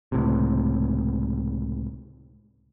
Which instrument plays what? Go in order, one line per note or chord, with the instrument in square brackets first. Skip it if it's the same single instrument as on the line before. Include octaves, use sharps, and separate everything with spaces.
[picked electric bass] C#2 A2 C3